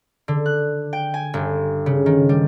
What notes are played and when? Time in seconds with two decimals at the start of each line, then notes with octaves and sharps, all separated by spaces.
0.28 D3
0.46 F#6
0.93 G5
1.14 G#5
1.34 G1
1.86 C#3
2.06 D#3
2.29 G3